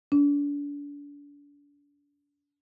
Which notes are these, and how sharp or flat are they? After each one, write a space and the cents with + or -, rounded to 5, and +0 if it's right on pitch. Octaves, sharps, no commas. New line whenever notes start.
D4 -35